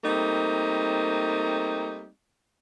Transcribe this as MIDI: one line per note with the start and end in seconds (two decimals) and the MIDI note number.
0.04 2.07 55
0.04 2.07 57
0.04 2.07 58
0.04 2.07 60
0.04 2.07 63